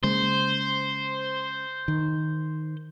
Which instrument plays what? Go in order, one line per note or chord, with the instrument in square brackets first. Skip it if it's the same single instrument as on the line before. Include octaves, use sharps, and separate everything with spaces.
[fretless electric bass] C#3 G#3 A#3 [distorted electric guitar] C5
[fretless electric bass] D#3